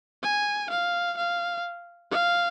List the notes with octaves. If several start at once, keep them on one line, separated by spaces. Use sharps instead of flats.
G#5
F5
F5
F5